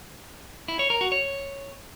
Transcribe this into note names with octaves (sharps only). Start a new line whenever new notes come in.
E4
C#5
A#4
F#4
C#5